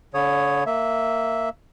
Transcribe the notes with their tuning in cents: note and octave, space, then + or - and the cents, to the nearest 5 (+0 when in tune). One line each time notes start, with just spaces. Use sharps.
D3 -35 C#5 +0 D#6 +0
A#3 -15 E5 -5